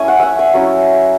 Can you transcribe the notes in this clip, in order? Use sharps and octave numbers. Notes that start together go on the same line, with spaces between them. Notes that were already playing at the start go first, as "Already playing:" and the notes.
Already playing: A3 C#4 E4 G#5
F#5
E5 F#5
G#5
F#3 C#4 E4